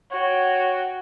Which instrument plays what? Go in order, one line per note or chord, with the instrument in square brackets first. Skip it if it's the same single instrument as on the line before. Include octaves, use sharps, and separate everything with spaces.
[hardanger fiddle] F#4 G5 [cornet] C#5